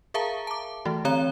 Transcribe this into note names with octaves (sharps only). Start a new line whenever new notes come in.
G#4 A#4 E5 F5 A5 A#5
A5 D6
E3 A3 F#4
D3 C4 C#5 A#5 G7